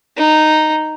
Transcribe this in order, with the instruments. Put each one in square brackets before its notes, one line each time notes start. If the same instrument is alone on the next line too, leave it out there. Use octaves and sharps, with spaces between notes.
[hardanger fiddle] D#4